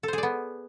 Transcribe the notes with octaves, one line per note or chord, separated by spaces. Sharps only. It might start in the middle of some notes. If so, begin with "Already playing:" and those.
B3 G#4 A4 C5 D5